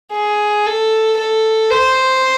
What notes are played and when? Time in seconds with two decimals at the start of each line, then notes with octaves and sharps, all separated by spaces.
0.13 G#4
0.66 A4
1.18 A4
1.71 C5